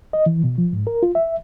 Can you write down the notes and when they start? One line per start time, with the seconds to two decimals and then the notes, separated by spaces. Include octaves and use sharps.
0.13 D#5
0.26 E3
0.44 B2
0.58 F3
0.73 G#2
0.87 A#4
1.03 F4
1.15 E5